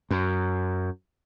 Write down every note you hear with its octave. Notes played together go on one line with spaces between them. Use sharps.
F#2